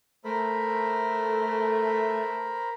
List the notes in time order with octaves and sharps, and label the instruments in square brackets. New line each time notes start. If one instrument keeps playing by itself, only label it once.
[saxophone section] A3 [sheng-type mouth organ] A#4 C5 B5